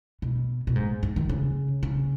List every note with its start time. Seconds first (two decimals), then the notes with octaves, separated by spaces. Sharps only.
0.22 B2
0.67 B2
0.76 G#2
1.03 G#2
1.16 D#3
1.29 C#3
1.83 C#3